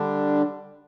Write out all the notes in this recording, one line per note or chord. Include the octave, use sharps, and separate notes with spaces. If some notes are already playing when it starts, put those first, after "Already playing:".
Already playing: D3 G3 D4